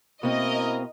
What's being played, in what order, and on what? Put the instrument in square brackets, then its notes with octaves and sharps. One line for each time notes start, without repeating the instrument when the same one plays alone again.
[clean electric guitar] B2 [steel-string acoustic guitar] A#3 C4 [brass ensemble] E4 A#4 [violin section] D#5